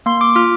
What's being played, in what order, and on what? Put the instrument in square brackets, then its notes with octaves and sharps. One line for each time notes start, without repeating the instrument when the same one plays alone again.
[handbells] A#3 C6
D6
F4 F6